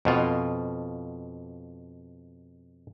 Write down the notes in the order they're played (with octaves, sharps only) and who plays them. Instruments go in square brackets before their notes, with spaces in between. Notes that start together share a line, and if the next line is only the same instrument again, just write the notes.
[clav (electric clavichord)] F2 B2 F4